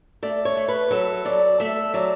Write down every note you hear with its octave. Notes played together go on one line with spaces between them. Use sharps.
A3 D5
C#5
A3
B4
F#3 A4
F#3 D5
A3 E5
F#3 D5